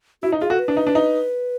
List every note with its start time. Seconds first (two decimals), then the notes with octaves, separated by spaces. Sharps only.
0.23 E4 F#4
0.32 D#4
0.41 F4 G#4
0.50 F#4 A4
0.59 B4
0.68 D4
0.77 D#4
0.87 D4
0.95 D#4